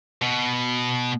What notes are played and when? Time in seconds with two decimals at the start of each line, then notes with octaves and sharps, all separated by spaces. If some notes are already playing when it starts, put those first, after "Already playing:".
0.22 B2